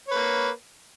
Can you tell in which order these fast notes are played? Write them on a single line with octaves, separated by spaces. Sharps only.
C#5 B4 A#3